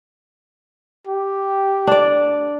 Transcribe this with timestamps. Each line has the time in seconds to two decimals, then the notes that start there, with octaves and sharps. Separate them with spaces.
1.07 G4
1.87 D4 D5